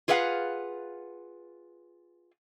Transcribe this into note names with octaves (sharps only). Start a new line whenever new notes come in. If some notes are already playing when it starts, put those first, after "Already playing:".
F4 G#4 B4 D5 F5 F#5